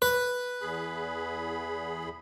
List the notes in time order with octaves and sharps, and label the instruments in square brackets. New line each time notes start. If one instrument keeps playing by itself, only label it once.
[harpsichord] B4
[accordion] E2 G#4 B5